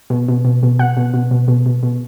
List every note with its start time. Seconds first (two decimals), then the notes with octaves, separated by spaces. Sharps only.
0.10 B2
0.28 B2
0.45 B2
0.63 B2
0.79 B2 F#5
0.97 B2
1.14 B2
1.31 B2
1.48 B2
1.66 B2
1.83 B2